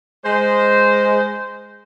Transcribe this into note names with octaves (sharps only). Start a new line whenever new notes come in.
G#3 C5